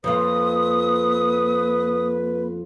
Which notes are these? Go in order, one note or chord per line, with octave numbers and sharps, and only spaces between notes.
F2 A#3 F4 B4 D#6